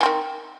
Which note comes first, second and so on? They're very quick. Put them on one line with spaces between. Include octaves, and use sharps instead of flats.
E3 C4 D#3